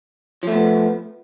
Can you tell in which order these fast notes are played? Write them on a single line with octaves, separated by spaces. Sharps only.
F3 A3 B3